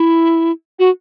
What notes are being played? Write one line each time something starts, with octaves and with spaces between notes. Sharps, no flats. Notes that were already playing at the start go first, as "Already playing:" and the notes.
Already playing: E4
F#4